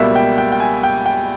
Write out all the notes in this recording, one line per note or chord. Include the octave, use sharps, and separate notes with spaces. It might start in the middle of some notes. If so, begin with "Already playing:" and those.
Already playing: C#2 B2 G3 A#3 E5
G5
G5
G5
G#5
G5
G5